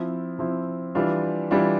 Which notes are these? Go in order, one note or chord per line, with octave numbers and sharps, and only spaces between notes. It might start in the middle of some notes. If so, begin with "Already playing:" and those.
Already playing: F3 C4 E4
F3 C4 E4
E3 G3 D4 F4
E3 G3 D4 F4